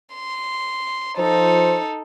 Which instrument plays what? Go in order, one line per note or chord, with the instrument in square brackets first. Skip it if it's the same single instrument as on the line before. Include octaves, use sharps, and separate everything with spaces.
[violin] C6
[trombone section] F3 C5 [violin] D#4 A4